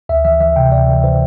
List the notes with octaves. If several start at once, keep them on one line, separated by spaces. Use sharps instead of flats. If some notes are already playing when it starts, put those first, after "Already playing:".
D2 E5
E3 E5
E3 E5
C3 G5
D2 D5
E3
E3 C5